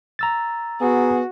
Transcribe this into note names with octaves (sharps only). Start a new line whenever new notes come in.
A#5 E6 A6
B3 F#4 G#4